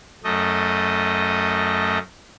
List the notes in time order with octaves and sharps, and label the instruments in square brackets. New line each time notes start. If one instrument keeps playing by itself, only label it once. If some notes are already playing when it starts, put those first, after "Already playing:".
[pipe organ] F#2 A3 D#5